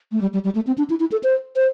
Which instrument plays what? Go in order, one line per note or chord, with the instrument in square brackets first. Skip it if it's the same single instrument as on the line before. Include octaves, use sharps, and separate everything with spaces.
[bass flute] A3
G3
G3
G3
A3
C4
D4
E4
E4
A4
C5
C5